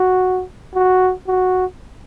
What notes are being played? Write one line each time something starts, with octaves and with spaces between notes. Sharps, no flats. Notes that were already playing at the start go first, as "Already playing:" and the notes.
Already playing: F#4
F#4
F#4